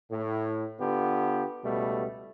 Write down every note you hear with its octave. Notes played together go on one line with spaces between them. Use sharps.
A2
D3 B3 F4 G4
C#2 B2 G3 A3